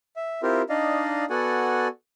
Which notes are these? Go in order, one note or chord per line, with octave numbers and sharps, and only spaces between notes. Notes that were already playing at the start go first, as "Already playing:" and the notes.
E5
C4 E4 F4 G4 A#4
D4 D#4 D5 D#5 F5
B3 F#4 A4 D5 F#5 G#5